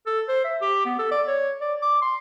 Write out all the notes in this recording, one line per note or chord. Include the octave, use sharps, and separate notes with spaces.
A4
C5
E5
G4
B3
A4
D5
C#5
D5
D6
C6